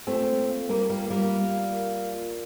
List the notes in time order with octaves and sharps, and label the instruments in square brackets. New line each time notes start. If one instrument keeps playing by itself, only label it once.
[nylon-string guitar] A3 C4 [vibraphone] F4
[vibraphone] A#3
F5
[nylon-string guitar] G3 A#3 [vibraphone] A#4
[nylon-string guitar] G3 A#3 [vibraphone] F4
[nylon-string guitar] G3 A#3 [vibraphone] F4
[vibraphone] F5
D5
A#4
D5
F4